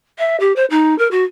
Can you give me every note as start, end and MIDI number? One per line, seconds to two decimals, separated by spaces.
0.19 0.37 76
0.40 0.53 67
0.56 0.65 72
0.70 0.97 63
0.98 1.08 70
1.11 1.24 66